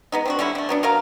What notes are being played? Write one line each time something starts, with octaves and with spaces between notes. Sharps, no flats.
G#3 B3 D#4
C4 D4 F#4
D3 G3 C#4 E4
A3 D4
F#3 B3 D4
F#3 C#4 A#4 F5